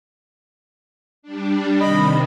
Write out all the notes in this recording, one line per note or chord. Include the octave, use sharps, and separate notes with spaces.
G3 D4
C3 D#3 D#5 B5